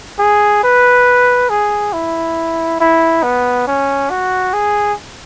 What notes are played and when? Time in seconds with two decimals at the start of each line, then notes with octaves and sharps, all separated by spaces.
0.19 G#4
0.64 B4
1.50 G#4
1.93 E4
2.80 E4
3.23 B3
3.67 C#4
4.11 F#4
4.54 G#4